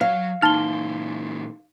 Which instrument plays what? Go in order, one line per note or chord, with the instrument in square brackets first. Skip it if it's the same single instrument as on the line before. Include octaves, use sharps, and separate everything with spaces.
[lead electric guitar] F#3 C#5 [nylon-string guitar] F5
[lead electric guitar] A#2 E3 [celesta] D#4 C6 G7 [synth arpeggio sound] A5 F6